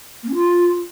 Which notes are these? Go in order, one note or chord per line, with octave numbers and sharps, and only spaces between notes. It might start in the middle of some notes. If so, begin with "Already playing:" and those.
A#3
C#4
F4